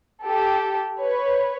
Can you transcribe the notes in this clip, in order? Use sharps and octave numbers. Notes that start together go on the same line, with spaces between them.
G4 A4
B4 C#5